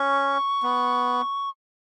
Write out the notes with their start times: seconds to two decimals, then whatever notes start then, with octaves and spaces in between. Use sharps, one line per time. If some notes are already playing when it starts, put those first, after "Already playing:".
Already playing: C#4 C#6
0.63 B3